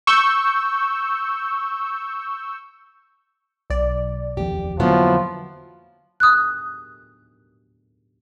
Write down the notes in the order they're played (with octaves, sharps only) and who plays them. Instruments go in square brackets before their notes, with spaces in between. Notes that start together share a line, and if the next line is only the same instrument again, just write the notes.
[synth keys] C#6 E6 G6
[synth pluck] B1 D5
[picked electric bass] F1 D#2 F3 [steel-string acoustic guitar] G4
[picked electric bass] F2 D3 A#3 [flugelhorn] F3 [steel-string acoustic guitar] F#3 B3 E4
[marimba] D#6 F#6